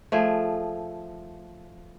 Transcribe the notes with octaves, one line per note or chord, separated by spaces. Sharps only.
F3 A3 G#4